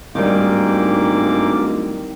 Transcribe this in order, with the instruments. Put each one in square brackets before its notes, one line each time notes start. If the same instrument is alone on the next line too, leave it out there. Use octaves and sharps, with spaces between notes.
[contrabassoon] D1 [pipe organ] G#2 A#3 D6 [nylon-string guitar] D#3 G3